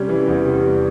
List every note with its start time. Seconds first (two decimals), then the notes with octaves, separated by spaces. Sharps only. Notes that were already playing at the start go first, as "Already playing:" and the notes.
Already playing: C3 G3 C#4
0.09 E3
0.28 E2
0.46 C3
0.63 G3